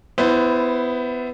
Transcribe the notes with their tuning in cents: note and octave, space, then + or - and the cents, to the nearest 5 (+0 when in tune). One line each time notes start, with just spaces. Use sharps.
B3 +20 E4 +0 C5 +0